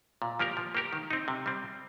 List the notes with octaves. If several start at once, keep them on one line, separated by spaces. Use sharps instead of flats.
A#2
F3 A#3 G4 A#4
F3
A#3 G4 A#4
D#3
C4 D#4
C3
G3 C4